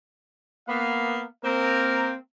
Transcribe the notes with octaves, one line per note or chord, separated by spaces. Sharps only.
A#3 B3 F5
A#3 C4 A#4